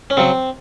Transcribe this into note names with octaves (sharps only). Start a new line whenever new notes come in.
C#4
C#3 F#3 C4